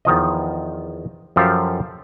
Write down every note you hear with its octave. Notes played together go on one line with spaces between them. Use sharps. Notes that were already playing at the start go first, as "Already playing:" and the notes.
E2 D#3 F3 D#5
F#2 F3 G4 A4 F5 A5